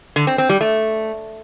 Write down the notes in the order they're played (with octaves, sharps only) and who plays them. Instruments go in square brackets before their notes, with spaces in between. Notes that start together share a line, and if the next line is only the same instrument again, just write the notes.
[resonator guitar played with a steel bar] D3
C4
C4
G3
A3